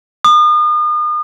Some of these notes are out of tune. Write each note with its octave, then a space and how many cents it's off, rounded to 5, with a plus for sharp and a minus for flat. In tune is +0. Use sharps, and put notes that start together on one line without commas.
D#6 -40